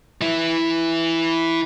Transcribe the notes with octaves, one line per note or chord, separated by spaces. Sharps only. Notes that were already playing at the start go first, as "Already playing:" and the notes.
E3 E4